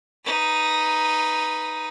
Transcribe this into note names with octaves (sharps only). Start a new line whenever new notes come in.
D#4 B4